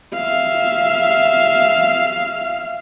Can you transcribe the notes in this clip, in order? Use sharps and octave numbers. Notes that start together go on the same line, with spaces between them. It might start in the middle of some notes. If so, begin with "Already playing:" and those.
E5 F5